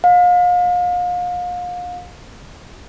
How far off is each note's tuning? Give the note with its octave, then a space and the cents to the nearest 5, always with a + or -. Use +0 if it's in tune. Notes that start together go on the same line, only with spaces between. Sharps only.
F5 +35